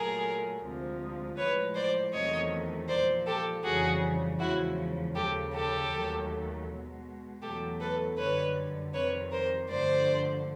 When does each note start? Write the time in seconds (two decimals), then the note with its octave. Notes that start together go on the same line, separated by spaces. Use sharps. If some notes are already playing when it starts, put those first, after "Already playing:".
Already playing: A#2 F#3 A3 G#4 A#4
0.62 D2 C3 F3 G#3
1.37 A2 F3 G#3 B4 C#5
1.75 C5 D5
2.13 E2 C3 D#3 F#3 A3 C#5 D#5
2.88 A#2 F3 G#3 C5 D5
3.27 G4 A4
3.64 F2 C#3 E3 G3 F#4 G#4
4.40 E2 C#3 F3 G#3 E4 F#4
5.15 D#2 C#3 F3 G4 A4
5.53 G4 A4
5.92 D#2 D#3 F#3 A3
6.67 B2 G#3
7.42 E2 B2 F#3 A3 G4 A4
7.80 A4 B4
8.18 F#2 D3 G3 B4 C#5
8.94 F2 C3 D#3 G3 B4 C#5
9.31 A#4 C5
9.70 G2 D3 F3 A3 C5 D5